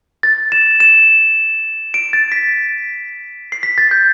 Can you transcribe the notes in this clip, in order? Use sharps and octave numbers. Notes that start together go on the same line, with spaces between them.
A6
E7
E7
D7
A6
B6
C7
B6
A6
G6